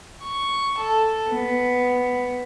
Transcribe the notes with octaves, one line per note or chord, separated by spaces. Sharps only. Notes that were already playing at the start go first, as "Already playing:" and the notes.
C#6
A4
B3